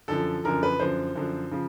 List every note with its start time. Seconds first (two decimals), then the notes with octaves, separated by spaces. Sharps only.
0.08 F#2 D3 F3 A4
0.44 F#2 D3 F3 A#4
0.63 B4
0.79 F#2 D3 F3 C5
1.15 F#2 D3 F3
1.51 C#3 F3